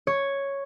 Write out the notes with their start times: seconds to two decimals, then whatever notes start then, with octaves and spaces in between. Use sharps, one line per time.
0.07 C#5